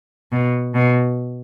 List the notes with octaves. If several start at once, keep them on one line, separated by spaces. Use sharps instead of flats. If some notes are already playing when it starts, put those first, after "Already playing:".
B2
B2